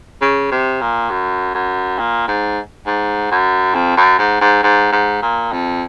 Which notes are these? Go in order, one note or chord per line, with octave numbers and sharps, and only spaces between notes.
C#3
C3
A#2
F#2
F#2
A#2
G#2
G#2
F#2
F2
F#2
G#2
G#2
G#2
G#2
A#2
F2